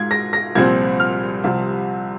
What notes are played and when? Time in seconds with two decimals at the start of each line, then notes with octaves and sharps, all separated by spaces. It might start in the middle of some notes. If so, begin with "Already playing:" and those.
Already playing: G#2 G#3 F4 G#6
0.11 A#6
0.33 A#6
0.55 C2 A#2 F3 C4 G#6
1.00 F6
1.44 C2 C3 F3